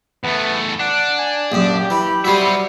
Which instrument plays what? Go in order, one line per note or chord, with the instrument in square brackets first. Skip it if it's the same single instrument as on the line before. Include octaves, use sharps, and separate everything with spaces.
[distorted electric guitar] E2 A3 [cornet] B3
[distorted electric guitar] D4 [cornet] F#5
[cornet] G#5
[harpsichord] A#1 F#2 [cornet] G4
[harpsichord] E3 [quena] B5
[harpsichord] F#3 G3 [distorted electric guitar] C5 E5